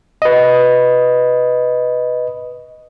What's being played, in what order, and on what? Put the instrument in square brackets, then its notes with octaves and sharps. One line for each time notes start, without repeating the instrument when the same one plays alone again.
[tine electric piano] B4 D#5